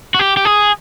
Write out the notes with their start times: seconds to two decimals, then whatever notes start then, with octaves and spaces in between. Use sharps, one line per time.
0.14 F#4
0.19 G4
0.37 G4
0.45 G#4